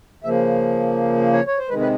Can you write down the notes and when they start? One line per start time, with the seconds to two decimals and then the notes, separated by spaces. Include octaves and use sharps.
0.24 C#3 F3 A#3 E5
1.33 C#5
1.47 C#5
1.58 C5
1.69 C3 D#3 G#3 B4
1.80 B4